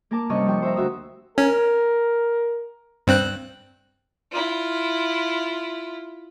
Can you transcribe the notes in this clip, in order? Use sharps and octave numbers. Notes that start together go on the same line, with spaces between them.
A#3 A#4 A5 D6
G2 C3 G3 C#4 D#5 C#6
G2 F3 F4 G5 C#6
C5 E5 A#5
D2 F#4 E5 D#6
C#4 A#4
G2 C4 F#6
E4 F4